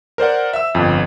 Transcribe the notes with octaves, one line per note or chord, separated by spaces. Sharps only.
A#4 C5 D5 F#5
E5 E6
G1 F2